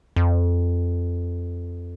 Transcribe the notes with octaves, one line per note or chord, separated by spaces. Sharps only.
F2